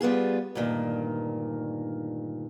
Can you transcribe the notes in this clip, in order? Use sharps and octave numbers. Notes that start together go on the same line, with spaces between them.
G3 B3 F4 G#4
D2 G2 A#2 D#3